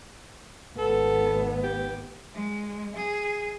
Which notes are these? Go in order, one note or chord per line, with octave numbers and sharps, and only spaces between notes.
G#1 B3 A4
G4
G#3
G#4